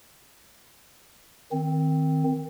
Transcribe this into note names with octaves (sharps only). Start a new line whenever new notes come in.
D#3 C4